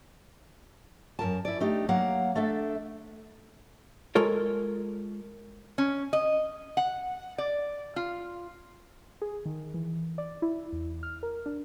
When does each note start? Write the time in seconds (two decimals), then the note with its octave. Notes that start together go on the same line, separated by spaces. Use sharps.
1.19 F#2 C3 A#4 A5
1.45 E4 D5
1.60 A3 D4 D#4 G4
1.89 F#3 A#3 F5 F#5
2.35 A3 D4 A4 E5
4.15 G#3 F4 A4 A#4 C#5
5.78 C#4
6.13 D#5
6.77 F#5
7.38 D5
7.96 F4
9.22 G#4
9.45 D#3
9.74 E3
10.18 D5
10.42 E4
10.72 E2
11.03 F6
11.23 A#4
11.46 D4